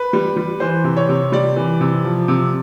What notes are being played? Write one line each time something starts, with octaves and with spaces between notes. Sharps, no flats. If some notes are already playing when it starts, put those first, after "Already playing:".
Already playing: B4
G3
G3
E3 C5
C3
C#5
C3
G3 D5
E3
C3
F3
C3